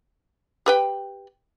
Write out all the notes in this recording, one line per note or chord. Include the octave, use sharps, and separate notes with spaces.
G4 B4 G5